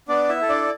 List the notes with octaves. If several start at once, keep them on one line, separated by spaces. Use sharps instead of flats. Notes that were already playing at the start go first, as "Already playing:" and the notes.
B3 D4 D5
E4 E5
E4 A4
D4 D5